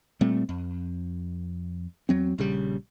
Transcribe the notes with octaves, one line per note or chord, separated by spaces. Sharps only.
A#2 G3 A3 C4
F2
E2 F#3 C4
A#1 C#3 G3